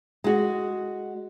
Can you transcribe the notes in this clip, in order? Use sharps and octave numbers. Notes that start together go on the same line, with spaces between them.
G#3 F#4